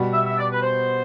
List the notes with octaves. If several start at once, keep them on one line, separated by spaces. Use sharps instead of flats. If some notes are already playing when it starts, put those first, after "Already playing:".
Already playing: B2 G3 B3 F#4
E5
E5
D5
B4
C5